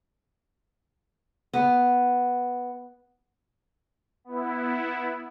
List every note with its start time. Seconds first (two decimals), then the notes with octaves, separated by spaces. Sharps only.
1.53 B3
4.24 B3 E4